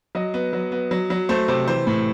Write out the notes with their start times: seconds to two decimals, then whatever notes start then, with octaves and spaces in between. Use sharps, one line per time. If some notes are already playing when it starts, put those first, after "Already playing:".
0.15 F#3 D#5
0.34 B3
0.53 F#3
0.72 B3
0.91 F#3
1.10 F#3
1.29 A3 C5
1.48 C3 C5
1.68 E3 C5
1.87 A2